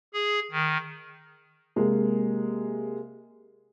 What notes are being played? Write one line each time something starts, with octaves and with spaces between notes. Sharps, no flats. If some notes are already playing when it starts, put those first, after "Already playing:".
G#4
D#3
C3 G#3 A#3